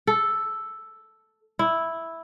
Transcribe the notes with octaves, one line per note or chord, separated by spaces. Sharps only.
A4
E4